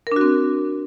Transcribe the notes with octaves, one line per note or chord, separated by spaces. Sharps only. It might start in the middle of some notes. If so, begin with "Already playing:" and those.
C4 D4 F#4 A#4